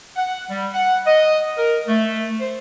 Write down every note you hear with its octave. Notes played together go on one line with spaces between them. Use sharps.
F#5
G3
F#5
D#5
A#4
A3
C5